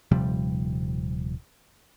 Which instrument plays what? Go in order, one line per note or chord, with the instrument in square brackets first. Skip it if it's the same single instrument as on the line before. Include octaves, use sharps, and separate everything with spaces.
[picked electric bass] D#1 C3 F3 G3